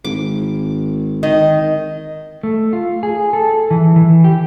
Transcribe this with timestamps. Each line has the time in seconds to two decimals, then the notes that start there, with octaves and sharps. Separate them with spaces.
0.04 G#1 D6
1.23 D#3 D#5
2.43 A3
2.73 F4
3.03 G#4
3.33 A4
3.71 E3
3.96 E3
4.24 G4